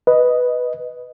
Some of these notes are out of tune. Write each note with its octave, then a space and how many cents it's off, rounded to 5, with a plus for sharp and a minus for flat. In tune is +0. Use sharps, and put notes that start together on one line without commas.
B4 +0 D#5 +0